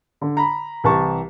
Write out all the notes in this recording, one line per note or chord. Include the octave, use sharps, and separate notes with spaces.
D3
A#5 B5
C2 E3 G4 A5 C#6